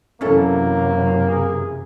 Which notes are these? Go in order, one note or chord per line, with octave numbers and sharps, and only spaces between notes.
F#2 C3 E3 F#3 A#3 C#4 E4 A4
G#4